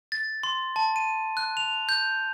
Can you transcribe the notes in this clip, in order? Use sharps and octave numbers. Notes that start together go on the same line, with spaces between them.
A6
C6
A5
D#7
F#6
F7
G6